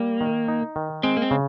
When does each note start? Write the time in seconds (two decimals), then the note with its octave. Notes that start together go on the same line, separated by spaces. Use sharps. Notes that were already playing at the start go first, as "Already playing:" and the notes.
Already playing: G3 A#3
0.21 D#3
0.48 D#4
0.76 D#3
1.03 G#3 C4
1.17 A#3
1.22 C4
1.31 C#3